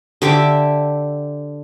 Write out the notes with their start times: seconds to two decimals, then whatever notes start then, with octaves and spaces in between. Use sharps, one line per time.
0.22 D3 G4 E5 D6